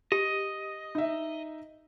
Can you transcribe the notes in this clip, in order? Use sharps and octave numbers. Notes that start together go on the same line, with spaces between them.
G4 D#5
D#4 E5